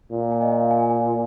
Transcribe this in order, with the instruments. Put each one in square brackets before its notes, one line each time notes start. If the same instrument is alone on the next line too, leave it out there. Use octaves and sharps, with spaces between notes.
[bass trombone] A#2
[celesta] G#5
D#5
F5
G#5
G#5